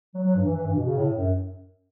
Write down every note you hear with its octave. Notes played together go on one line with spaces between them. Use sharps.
F#3
F#3
G2
E3
E3
G2
B2
C#3
A2
F#2